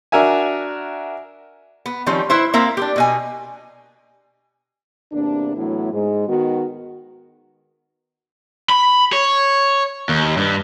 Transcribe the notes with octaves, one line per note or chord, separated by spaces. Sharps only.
D4 F#4 A#4 E5 G#5
B3
D#3 F3 G3 C4 C#4
E4 B4 C5 E5
A#3 C4 A#4 E5 F5
D4 G4
B2 D#5 G#5
E2 C3 A#3 D4
A2 E3 F#3 A3 B3 E4
G#2 G#3
D#3 B3 D#4 F#4
B5
C#5
D#2
G2